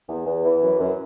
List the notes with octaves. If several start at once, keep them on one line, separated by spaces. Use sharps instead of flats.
E2
E2
E3
F#2
F#2